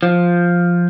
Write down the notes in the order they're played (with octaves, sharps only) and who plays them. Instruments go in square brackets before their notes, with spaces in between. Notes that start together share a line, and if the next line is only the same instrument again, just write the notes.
[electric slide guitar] F3